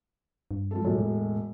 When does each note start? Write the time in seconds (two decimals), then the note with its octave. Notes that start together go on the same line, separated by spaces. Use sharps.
0.51 G2
0.71 F3 A3 A4
0.85 E1 A2 F#3
0.99 B2